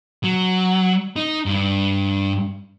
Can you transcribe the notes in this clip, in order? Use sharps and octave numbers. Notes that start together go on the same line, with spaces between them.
F#3
D#4
G2